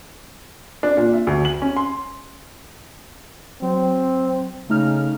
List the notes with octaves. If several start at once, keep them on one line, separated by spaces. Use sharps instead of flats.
D4
A#2
E5
D2
F#7
C#4
C6
F#3 C4
C#3 A3 D#4 F6